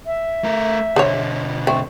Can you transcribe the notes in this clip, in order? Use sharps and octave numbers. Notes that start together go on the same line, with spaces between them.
E5
A3 A#4
B2 D3 G#4 C5 C#5
A3 C4 C#6